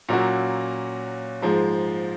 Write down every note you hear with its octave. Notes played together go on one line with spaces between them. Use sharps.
A#2 F#3 A#3 C#4 F#4
G#2 F3 G#3